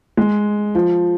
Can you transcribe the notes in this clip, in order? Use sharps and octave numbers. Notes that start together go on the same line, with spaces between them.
G#3
F3